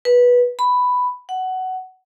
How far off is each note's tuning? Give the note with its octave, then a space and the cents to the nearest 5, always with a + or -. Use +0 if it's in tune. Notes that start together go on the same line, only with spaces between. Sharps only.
B4 -15
B5 +5
F#5 +15